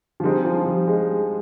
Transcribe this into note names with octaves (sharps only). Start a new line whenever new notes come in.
F3
D3 G3 G#3 C4 D#4
F3
G3
G#3